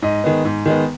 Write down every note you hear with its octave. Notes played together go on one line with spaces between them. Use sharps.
G#2 D#5
D#3 G#3 B3
G#2
D#3 G#3 B3